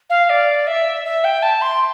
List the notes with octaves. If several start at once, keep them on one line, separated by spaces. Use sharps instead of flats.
F5
D5
E5
E5
G5
A5
C6